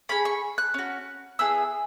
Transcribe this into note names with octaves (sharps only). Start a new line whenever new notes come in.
C#4 G#4 B5
C#6
F#6
C#4 F#4
B3 E4 G#4 E6